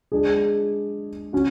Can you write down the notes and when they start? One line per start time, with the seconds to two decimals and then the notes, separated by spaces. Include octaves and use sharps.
0.12 G#3 D4 G#4
1.33 C#4 F#4